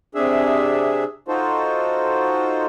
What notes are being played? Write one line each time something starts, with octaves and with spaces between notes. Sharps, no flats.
C3 D4 G#4 E5
D#4 F4 F#4 A4 C5